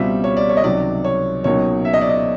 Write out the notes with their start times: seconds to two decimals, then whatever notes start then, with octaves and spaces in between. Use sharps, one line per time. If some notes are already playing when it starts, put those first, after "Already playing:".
Already playing: C#2 B2 G3 C4 F4 E5
0.24 C#5
0.37 D5
0.49 C#5
0.57 D#5
0.64 C#2 C3 D#3 F#3 D5
1.05 C#5
1.44 C#2 B2 F#3 A#3 D#4 C#5
1.85 E5
1.94 D#5
2.01 D5
2.09 D#5